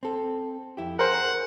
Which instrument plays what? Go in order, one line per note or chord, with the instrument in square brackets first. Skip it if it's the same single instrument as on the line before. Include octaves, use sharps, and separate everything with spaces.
[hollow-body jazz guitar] C4 A4
F2 E4 G4
[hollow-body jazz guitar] G#4 [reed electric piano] A#4 C5 [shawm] F#5